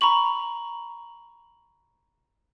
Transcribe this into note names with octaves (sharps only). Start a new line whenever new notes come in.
A#5 B5 C#6 F#7